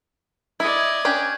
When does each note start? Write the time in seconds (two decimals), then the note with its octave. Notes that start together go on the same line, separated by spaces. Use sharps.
0.60 E4 D5 D#5 G#6
1.05 C#4 D4 G4